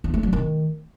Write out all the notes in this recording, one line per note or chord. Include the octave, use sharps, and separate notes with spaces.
E2
A3
F#3
D#3